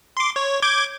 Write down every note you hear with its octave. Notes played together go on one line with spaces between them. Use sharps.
C6 D6
C#5
D6 G6 G#6